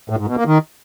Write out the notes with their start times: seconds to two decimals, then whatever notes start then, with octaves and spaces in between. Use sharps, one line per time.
0.10 A2
0.19 G#2
0.28 B2
0.37 A#3
0.46 D#3